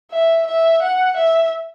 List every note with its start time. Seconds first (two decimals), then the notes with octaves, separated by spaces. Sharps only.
0.12 E5
0.47 E5
0.82 F#5
1.17 E5